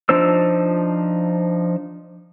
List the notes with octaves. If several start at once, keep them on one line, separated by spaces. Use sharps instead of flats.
F3 D4 D#4 C5 E6